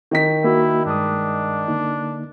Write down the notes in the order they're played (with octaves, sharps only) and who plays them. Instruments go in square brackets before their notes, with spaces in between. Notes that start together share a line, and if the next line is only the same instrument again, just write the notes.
[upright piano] D#3 D#4 B6
[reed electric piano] A#3 F#4 [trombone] E4
[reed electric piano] G2 G#3 D#6 [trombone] D4
[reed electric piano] D3 A#3 D#4